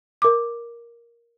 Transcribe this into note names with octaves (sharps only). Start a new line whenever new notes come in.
A#4 D6